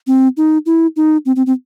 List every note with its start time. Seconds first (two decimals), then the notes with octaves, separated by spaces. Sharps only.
0.07 C4
0.37 D#4
0.66 E4
0.96 D#4
1.26 C4
1.36 C4
1.46 C4